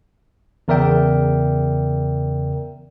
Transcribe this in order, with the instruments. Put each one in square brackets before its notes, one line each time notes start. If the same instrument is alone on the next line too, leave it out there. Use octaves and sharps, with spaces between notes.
[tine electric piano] E2 C#3 A#4 D5 E5 G5